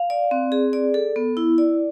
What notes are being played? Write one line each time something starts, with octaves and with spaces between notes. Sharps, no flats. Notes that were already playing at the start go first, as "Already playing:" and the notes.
Already playing: F5
D5
C4
G#4
D5
A4
B3
E4
D5